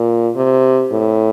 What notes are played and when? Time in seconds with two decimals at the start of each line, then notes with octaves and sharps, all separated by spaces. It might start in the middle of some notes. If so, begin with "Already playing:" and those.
Already playing: A#2
0.36 C3
0.91 A2